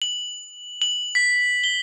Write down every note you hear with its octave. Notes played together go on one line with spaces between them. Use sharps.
F#7
F#7
B6
G7